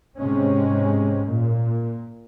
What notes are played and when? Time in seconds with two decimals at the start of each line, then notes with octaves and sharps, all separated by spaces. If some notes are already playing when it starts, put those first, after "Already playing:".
0.17 G#2 C3 G#3 C#4
1.25 A#2